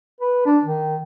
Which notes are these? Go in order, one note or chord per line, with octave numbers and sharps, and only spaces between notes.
B4
D4
D#3